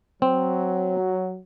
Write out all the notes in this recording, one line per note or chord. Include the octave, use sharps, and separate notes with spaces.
F#3 C4